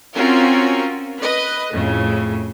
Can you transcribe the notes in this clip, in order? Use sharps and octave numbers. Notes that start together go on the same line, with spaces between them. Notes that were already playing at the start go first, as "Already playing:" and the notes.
C4 C#4 F4 F#4 A#4
B4 D#5
F2 A2 C#3